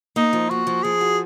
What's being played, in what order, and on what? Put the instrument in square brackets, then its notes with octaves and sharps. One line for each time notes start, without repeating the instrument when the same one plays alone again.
[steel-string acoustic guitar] A#3 [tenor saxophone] D#4
[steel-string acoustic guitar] F3
[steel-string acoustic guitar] A#3 [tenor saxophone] F#4
[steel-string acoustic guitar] F3
[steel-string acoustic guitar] F3 [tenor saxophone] G#4
[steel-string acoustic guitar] F#4